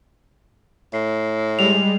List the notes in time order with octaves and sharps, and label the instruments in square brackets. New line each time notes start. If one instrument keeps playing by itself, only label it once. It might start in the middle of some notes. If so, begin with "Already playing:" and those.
[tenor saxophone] A2 [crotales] C7
[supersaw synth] G3 G#3 [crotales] F7